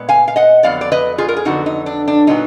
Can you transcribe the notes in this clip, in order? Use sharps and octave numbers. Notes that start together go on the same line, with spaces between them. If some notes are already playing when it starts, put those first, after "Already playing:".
Already playing: A#2 G#3 B3
F5 G#5
F5
D#5 F#5
F2 D3 F#3 B3 D5 F5
D5
B4 D#5
F4 G#4
A#4
G#4
F2 D3 F#3 B3 D#4 F#4
D#4
D4
D4
A#2 F#3 B3 D#4